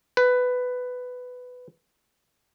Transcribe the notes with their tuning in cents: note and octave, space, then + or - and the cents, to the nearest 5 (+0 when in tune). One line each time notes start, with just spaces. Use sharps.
B4 +10